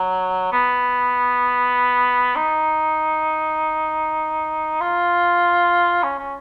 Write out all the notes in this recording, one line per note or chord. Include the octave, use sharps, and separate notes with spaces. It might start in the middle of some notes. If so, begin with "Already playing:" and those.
Already playing: F#3
B3
D#4
F4
C#4
C#4